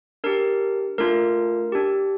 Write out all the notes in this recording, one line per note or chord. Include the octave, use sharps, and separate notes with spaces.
D4 G4 A#4
A3 D4 F4 A#4
D4 G4